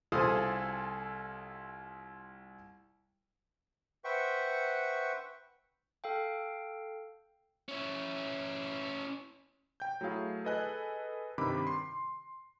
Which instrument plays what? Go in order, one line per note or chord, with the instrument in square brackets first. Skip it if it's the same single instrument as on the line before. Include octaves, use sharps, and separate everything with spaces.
[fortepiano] C2 F4 G#4 A4 C5 D#6
[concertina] B4 C5 E5 F#5 G5 C#6
[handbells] A4 F5 G5
[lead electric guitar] C#4 E4
[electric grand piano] G5 G6
F#3 A3 E4 G#4 F5
G#4 A4 B4 D#5 G#5 F#6
G2 C3 D#3 B5 D6
C6 C7